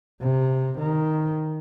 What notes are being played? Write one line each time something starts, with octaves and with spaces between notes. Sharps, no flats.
C3
D#3